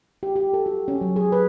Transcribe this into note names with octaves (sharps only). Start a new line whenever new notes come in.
G4
G4
A4
F#4
C#4
F#3
G#4
B4